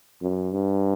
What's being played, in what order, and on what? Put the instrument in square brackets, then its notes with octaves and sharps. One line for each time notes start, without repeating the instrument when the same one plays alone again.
[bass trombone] F#2
G2